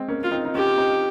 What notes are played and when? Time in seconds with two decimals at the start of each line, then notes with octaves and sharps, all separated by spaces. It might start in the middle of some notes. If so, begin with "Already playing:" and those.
Already playing: G#3 C4
0.08 A#3 C#4
0.23 F4
0.31 C4 D#4
0.45 D#4
0.54 C#4 F4 G4
0.78 C4 D#4